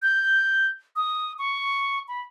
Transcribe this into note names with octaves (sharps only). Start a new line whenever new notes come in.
G6
D#6
C#6
B5